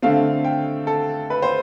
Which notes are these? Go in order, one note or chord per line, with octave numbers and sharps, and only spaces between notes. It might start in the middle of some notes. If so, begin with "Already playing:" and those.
D3 A3 C4 F5
G5
A4
B4
C5